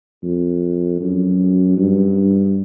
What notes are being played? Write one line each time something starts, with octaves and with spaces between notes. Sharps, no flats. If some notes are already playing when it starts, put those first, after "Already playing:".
F2
F#2
G2